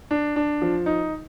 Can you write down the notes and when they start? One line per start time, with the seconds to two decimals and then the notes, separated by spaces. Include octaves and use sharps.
0.11 D4
0.36 D4
0.62 F3
0.86 D#4